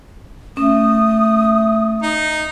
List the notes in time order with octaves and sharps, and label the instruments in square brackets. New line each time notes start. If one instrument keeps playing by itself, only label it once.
[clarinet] A3 [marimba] C#4 [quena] D#6
[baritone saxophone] D#4